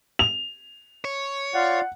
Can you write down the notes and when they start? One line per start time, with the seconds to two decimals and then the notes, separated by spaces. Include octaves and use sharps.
0.19 F7
1.05 C#5
1.54 F4 D5 F5 F#5